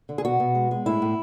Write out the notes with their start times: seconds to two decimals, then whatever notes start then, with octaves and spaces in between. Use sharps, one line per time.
0.09 D3
0.18 G#4
0.25 B2 F#4
0.40 B2
0.55 G#3
0.71 G#3
0.86 A2 E4
1.02 A2